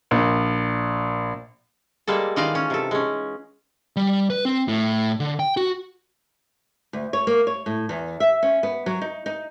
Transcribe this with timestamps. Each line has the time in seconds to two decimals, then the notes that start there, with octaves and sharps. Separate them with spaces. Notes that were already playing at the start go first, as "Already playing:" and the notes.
0.11 A#1
2.07 G3 G#3 A#3 A4
2.36 D#3 E3 D#4 F4 D5 F5
2.55 C#4
2.70 C3 A4
2.91 G#3 C#4
3.96 G3
4.30 B4
4.45 C4
4.68 A2
5.20 D3
5.39 G5
5.57 F#4
6.93 D2
7.13 C#5
7.27 A#3
7.47 C#5
7.66 A2
7.89 E2
8.20 E5
8.43 C#4
8.63 B3
8.86 F#3
9.01 D#4
9.26 D#4